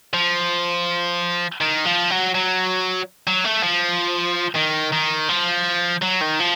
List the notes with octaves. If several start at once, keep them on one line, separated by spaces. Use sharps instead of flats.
F3
D#3
F3
F#3
F#3
F#3
A3
F3
D#3
D#3
F3
F#3
D#3
F3